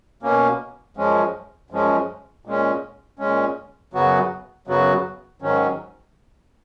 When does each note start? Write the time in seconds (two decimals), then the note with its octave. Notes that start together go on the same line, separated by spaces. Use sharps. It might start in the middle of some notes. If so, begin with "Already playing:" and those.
0.23 B2 A#3 C#4
0.97 F#2 F3 G#3 C#4
1.70 F#2 F3 G#3 C#4
2.45 A#2 G#3 C#4
3.19 A#2 G#3 C#4
3.93 F#2 C#3 F#3 B3 F#4
4.67 F#2 C#3 F#3 B3 F#4
5.42 G#2 D#3 F#3 C#4